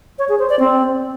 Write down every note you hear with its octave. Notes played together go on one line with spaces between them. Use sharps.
C#5
G#4
C5
D5
C4